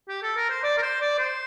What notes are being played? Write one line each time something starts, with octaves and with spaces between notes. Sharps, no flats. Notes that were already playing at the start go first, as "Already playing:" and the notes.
G4
A4
A#4
C5
D5
A#4
C5
D5
C5